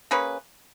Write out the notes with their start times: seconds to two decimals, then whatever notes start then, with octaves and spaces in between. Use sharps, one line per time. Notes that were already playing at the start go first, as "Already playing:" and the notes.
0.11 A#3 C#4 G#4 B4